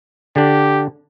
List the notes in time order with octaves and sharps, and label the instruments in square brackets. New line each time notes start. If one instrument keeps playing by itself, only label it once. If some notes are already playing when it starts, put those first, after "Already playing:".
[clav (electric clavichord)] D3 D4 [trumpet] G4